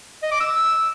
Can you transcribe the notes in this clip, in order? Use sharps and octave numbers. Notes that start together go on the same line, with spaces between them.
D#5
D6
E6